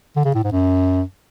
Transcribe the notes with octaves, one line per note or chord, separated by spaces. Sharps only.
D3
C#3
A2
G#2
F#2